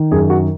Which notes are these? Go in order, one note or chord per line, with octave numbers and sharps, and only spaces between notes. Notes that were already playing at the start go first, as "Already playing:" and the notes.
Already playing: D#3
F#2 G#4
F#4